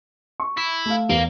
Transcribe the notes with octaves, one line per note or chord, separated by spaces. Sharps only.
C#6
E4
A3 F5
E2 A#3